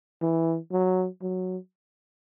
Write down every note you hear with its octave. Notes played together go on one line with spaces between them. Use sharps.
E3
F#3
F#3